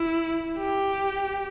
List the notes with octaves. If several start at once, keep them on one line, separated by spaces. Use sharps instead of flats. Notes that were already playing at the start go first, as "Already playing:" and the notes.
Already playing: E4
G4